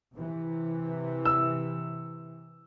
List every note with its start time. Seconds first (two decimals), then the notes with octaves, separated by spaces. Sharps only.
0.13 C3 E3
1.25 E6